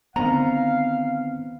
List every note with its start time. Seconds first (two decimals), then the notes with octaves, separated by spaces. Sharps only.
0.16 D3 D#3 B3 C4 F5 A#5